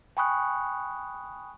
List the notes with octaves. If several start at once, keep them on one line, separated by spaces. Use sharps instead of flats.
G5 G#5 B5 C#6 D#6 F#6